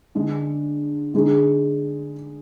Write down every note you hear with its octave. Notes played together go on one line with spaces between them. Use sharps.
D3 G#3 D4 G#4
D3 G#3 D#4 G#4